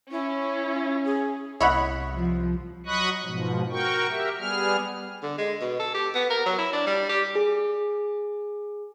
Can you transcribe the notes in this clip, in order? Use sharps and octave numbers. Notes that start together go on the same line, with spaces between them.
C#4 E4
G#4
C2 E4 C#5 D#5 F#5 B5
F3
F#3 D#5 B5 C#6 D#6 F#6
G#2 B2 F3
F#4 A#4 G5 C#6
G4 A#4 E5
G3 B3 G#4 F6
D3
G#3
B2
A4
G4
B3
A#4
F#3
E4
D4
G3
G4
G#4